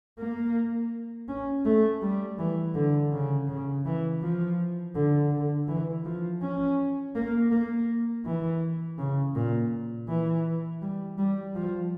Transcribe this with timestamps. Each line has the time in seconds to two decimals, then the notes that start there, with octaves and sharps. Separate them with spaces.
0.18 A#3
1.28 C#4
1.65 A3
2.02 G3
2.39 E3
2.75 D3
3.12 C#3
3.48 C#3
3.85 E3
4.22 F3
4.95 D3
5.31 D3
5.68 E3
6.05 F3
6.42 C#4
7.15 A#3
7.51 A#3
8.25 E3
8.98 C#3
9.35 A#2
10.08 E3
10.82 G3
11.18 G3
11.55 F3